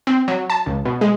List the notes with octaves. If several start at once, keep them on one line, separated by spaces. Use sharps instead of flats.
C4
F#3
A5
C#2
B2
G#3